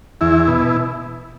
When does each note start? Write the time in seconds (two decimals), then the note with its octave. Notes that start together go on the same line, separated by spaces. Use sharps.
0.21 E2 E4
0.48 B2